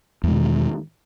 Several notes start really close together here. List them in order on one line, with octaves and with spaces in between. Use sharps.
E2 G#3 B2 D#3